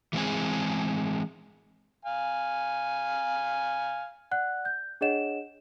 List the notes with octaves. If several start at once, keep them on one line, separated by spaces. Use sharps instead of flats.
E3 G#3 C4 G#4
F5 G#5
D5 F#5 F#6
G6
D4 G#4 C#5 D#5 F#5 E7